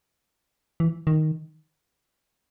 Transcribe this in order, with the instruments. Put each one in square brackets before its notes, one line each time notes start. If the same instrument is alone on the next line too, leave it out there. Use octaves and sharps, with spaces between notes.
[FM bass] E3
D#3